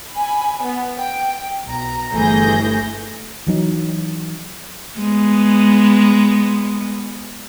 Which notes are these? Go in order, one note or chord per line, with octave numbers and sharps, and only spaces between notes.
G#5 B5
B3
G5
B1 A#5
G1 E3 A3 G#4 G6 A#6
E3 F#3 D#4
G#3 B3